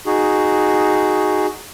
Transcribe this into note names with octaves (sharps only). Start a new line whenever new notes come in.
D#4 F#4 G#4